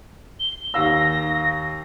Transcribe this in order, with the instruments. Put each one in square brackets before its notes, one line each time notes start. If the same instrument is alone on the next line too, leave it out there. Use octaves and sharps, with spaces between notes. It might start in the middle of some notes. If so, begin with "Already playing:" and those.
[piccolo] G7
[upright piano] D#2 F5 E6 [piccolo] A#6